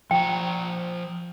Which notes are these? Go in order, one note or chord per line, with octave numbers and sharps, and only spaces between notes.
F3 G5 A#5